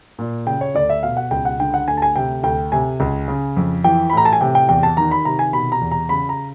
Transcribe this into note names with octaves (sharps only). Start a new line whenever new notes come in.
A#2
C#3 G5
C#5
D2 D5
E5
B2 F5
F#5
C#2 G5
F#5
D3 G5
F#5
D2 G#5
A5
G#5
C3 G5
D2 G5
C3 G#5
C#2
C#3
F2
E3 G5
B5
A2 A#5
A5
G#5
C3 G5
G5
E2 G5
A5
D#3 A#5
B5
C3 A#5
G#5
B2 B5
A#5
E2
A#5
C#3 B5
A#5